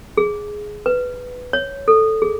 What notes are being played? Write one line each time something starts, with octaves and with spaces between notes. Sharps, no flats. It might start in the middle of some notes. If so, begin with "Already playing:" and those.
G#4
B4
C#5
A4
G#4